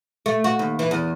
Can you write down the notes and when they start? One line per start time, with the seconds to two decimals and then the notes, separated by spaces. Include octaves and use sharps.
0.26 A3
0.44 F#4
0.59 D#2
0.79 E3
0.91 E2